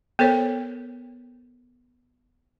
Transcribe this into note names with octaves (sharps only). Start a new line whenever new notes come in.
B3 A4 A#4 C5 C#5